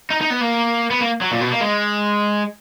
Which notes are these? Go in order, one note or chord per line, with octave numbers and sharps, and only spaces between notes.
D#4
D#4
B3
A#3
B3
A#3
F#3
A#2
B2
A#3
G#3